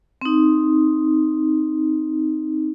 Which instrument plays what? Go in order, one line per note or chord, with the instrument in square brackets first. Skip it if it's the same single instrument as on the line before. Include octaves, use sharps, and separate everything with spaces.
[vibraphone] C4 D#4